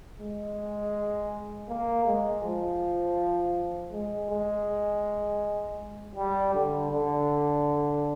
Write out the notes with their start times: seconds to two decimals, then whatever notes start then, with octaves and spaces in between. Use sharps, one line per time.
0.19 G#3
1.69 A#3
2.06 G#3
2.44 F3
3.92 G#3
4.30 G#3
6.16 G3
6.54 D3
6.91 D3